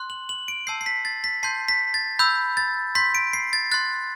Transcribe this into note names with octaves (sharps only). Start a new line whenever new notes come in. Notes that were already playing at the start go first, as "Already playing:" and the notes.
Already playing: C6 F#6
F#7
F#7
D7
A5 E6 G6 C7
C7
B6
A6
B6
A5 C6 G6 C7
B6
A6
B5 E6 G6
A6
C6 G6 B6
D7
C7
A6
C6 F#6 A6